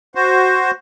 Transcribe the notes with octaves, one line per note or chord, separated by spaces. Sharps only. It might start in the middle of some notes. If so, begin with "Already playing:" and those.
F#4 C5